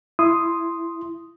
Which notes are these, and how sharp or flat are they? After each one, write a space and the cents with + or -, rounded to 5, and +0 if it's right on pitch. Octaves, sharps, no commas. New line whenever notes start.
E4 +15 C6 +0 D#6 +0